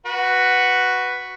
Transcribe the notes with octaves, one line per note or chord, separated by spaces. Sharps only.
F#4 B4